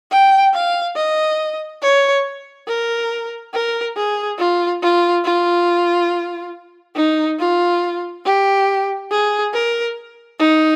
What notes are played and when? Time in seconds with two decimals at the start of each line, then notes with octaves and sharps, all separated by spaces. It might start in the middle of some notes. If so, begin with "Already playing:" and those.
0.11 G5
0.54 F5
0.96 D#5
1.82 C#5
2.68 A#4
3.53 A#4
3.96 G#4
4.39 F4
4.82 F4
5.25 F4
6.96 D#4
7.39 F4
8.25 G4
9.11 G#4
9.53 A#4
10.39 D#4